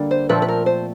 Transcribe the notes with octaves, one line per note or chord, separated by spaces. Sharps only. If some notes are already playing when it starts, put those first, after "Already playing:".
Already playing: D3 G3 A#3
C5
A#2 F3 A3 C4 B4
B4
A#4
C5